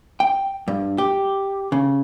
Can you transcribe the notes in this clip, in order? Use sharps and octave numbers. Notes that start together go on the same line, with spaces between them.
G5
G2
G4
C#3